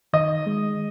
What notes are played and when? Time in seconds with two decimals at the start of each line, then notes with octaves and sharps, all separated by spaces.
0.13 D#3 D#5
0.47 G#3